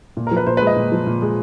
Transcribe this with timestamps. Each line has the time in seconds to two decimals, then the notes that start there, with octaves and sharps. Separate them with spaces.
0.17 A#2
0.27 A#4
0.31 F3
0.37 B4
0.47 A#2 C5
0.57 B4
0.62 G#3
0.67 D#5
0.77 A#2
0.92 F3
1.07 A#2
1.22 G#3